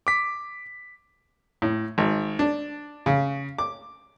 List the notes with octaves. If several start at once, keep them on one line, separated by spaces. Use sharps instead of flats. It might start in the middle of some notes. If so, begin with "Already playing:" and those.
D6 B6
A2
G#1
D4
C#3
D6